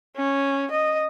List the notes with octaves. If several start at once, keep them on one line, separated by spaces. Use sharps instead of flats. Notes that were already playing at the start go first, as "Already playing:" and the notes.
C#4
D#5